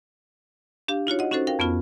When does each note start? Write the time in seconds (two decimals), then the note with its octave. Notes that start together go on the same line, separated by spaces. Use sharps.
0.88 D4 G4 F5
1.07 D#4 F4 F#4 C#5
1.19 D#5 F#5
1.31 C#4 D#4 F#4 A4 C5
1.47 A#4 F5 G5
1.59 F2 B3 C#4 F4